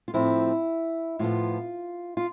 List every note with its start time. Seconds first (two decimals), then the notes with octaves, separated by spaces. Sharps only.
0.08 F4
0.14 A2 F3 C4 E4
1.19 A2 F3 B3 F4
2.17 F4